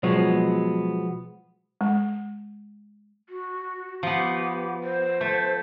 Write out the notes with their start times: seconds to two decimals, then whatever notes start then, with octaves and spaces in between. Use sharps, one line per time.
0.03 B2 F3 F#3 G#3 B3
1.81 G#3
3.29 F#4
4.03 F3 B3 G4
4.83 C5
5.21 A3